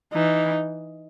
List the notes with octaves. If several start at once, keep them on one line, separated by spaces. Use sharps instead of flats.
E3 D#4